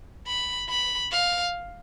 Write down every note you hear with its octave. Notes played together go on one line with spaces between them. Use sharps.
B5
B5
F5